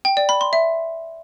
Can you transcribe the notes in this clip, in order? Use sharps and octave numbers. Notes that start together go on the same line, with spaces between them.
G5
D5
B5
C6
E5